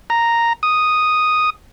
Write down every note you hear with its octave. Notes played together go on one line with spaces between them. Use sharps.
A#5
D#6